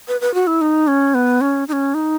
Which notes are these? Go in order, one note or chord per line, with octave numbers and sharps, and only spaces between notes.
B4
B4
F#4
E4
D#4
C#4
B3
C#4
D#4
C#4
D#4